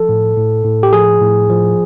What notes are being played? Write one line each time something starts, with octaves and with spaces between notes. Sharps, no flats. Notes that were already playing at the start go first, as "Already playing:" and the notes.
Already playing: F3 A4
A2
A2
A2
G4
F3 G#4
A2
F3